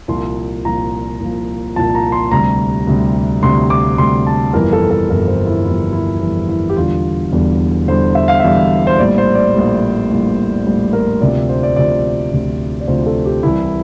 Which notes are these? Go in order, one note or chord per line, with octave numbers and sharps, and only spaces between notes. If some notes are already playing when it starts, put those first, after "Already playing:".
C2 A#2 F3 C6
C2 A#2 F3 A#5
C2 A#2 F3
C2 A#2 F3 A5
A#5
C6
D2 C3 G3 A#5
D2 C3 G3
D2 C3 G3 C6
D6
D2 C3 G3 C6
A5
G1 F2 E3 G3 A#4
A4
A4
G1 F2 E3 G3 A#4
C5
E4
G1 F2 E3 G3 E4
E4
G1 F2 E3 G3
E4
G4
E1 E2 D3 G3 F4
E1 E2 D3 G3
E1 E2 D3 G3 C5
E5
F5
E1 E2 D3 G3 E5
C5
A#1 A2 G3 D5
C5
D5
A#1 A2 G3
A#1 A2 G3
A#1 A2 G3 D5
A#4
D2 C3 F3 D5
C5
D5
D2 C3 F3 D5
D2 C3 F3
D5
D2 C3 F3 C5
A4
G4
C2 C3 E3 G3 E4